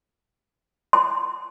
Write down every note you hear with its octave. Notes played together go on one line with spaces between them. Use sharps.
C6